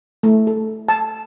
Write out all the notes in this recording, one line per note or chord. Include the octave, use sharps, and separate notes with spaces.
A3
A4
A5